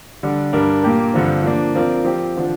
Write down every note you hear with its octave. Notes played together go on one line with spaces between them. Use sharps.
D3 G3 D4
G2 G3 D4 A#4
A#2 A#3 G4 A#4
G2 D3 F3 C4
F3 A#3 D4
F3 C4 F4 A#4 D5
F3 C4 G4
D3 F3 D4